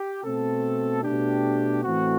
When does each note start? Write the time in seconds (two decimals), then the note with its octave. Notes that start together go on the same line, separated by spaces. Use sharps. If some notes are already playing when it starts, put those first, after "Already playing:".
Already playing: G4
0.24 B2 A3 C4 A4
1.04 B2 A3 D4 G4
1.83 A2 E3 A3 C4 F#4